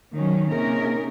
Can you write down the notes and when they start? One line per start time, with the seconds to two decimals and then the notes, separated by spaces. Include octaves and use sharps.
0.15 D#3 F#3 C#4
0.50 C3 A#3 C#4 D#4 G#4 A#4